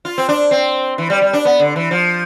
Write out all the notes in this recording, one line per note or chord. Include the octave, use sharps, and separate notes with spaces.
F4
C4
D4
C4
E3
G3
G3
D4
B3
D3
E3
F3